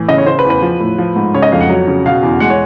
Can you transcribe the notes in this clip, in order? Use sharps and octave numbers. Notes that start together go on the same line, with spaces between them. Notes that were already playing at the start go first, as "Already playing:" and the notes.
Already playing: A2 E3
C#3 D#5
C#5
C#3 C5
B4
E2
B4
F3
A2
F3
G#2
C#3 C#5
D#5
F2 F5
F#5
F#3
C#3
B2 F5
E2
G#3 F#5
C#5